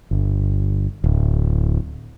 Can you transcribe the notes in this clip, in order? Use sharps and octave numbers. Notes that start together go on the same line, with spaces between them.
G1
D1